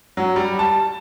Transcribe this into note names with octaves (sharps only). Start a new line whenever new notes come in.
F#3
G3
A5